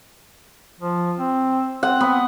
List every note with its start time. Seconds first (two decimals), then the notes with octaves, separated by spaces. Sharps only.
0.80 F3
1.19 C4
1.83 C4 F#5
2.00 B3